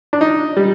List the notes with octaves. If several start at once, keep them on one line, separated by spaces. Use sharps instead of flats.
D4
D#4
G3